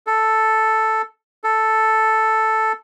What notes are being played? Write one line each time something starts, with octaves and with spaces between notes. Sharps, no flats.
A4
A4